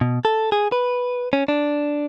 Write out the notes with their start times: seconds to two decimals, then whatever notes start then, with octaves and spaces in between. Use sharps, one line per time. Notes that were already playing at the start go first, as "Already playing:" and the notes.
0.01 B2
0.25 A4
0.52 G#4
0.72 B4
1.33 C#4
1.48 D4